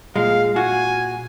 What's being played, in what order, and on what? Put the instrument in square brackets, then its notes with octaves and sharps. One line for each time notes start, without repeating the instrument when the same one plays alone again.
[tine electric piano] A#2 [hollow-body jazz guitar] G#3 [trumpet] F5
[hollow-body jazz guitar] F#4 [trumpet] G#5